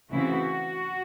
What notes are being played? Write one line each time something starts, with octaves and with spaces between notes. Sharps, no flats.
C#3 E3 A3 C4 E4 F#4